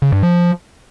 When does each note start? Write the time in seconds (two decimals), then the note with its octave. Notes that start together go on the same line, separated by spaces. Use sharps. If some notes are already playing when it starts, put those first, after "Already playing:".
0.02 C#3
0.12 G2
0.23 F3